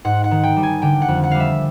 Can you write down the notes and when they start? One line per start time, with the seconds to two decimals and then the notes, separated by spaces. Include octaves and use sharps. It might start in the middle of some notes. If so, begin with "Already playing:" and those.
0.05 G#2 F#5
0.24 F#5
0.31 D#3
0.43 G5
0.56 G3
0.63 G#5
0.82 D3 G5
1.02 F#5
1.08 F2
1.23 F#5
1.31 G3 F5
1.40 E5